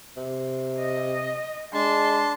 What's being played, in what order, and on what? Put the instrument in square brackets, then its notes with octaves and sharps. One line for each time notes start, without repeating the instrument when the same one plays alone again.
[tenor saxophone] C3
[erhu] D#5
[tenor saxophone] G#3 [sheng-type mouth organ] D4 A5 [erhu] C6